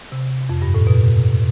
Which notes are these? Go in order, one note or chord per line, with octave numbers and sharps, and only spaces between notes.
C3
F2
G2
A2
B2